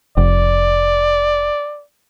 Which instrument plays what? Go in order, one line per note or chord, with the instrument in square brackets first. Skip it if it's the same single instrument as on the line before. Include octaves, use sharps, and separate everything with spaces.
[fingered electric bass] F1 [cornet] D5